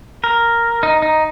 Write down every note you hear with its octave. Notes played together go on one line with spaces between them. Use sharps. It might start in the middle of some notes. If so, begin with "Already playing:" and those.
A#4
D#4
D#4